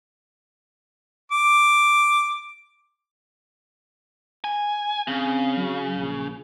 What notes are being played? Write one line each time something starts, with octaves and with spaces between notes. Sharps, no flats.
D6
G#5
C#3 C4
F#3
A#1